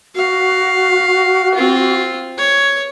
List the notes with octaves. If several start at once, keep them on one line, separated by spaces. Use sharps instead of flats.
F#4 F5
C4 F4
C#5